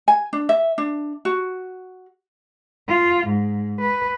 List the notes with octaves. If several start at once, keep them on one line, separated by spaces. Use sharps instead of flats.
G#5
D4
E5
D4
F#4
F4
G#2
B4